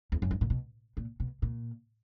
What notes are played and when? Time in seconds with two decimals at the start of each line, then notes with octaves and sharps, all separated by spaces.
0.12 E2
0.22 F#2
0.31 G2
0.41 A#2
0.50 B2
0.97 A#2
1.20 B2
1.42 A#2